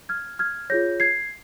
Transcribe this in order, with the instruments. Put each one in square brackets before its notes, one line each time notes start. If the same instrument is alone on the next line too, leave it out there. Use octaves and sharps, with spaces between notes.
[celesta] F6 G#6
F6 G#6
F4 G#4 C#5 G6 A#6
G#6 C7